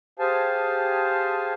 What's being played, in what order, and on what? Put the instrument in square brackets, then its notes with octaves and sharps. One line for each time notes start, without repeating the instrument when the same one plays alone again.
[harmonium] G4 G#4 C5 F5 G#5 A5